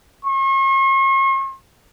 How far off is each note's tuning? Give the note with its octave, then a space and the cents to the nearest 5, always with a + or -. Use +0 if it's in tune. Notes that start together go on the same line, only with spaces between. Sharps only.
C#6 -45